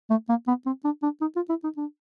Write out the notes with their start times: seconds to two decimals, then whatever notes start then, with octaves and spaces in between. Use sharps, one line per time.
0.10 A3
0.29 A#3
0.48 B3
0.66 C4
0.85 D4
1.03 D4
1.21 D#4
1.36 F4
1.49 E4
1.64 D#4
1.77 D4